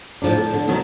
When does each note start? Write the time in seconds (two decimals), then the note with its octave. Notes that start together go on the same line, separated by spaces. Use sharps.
0.22 A2 F3 D4
0.38 A4
0.54 D3
0.68 D2 B2 D#3 F#3